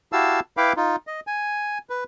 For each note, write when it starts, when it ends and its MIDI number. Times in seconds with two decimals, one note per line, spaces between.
0.13 0.40 64
0.13 0.40 66
0.13 0.40 67
0.13 0.40 77
0.13 0.40 81
0.13 0.40 88
0.57 0.73 64
0.57 0.73 71
0.57 0.73 77
0.57 0.73 79
0.57 0.73 83
0.57 0.73 86
0.77 0.96 63
0.77 0.96 65
1.07 1.20 75
1.27 1.78 80
1.90 2.04 71